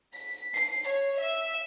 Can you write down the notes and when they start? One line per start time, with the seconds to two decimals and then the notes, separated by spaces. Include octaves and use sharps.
0.16 B6
0.55 C7
0.88 C#5
1.19 E5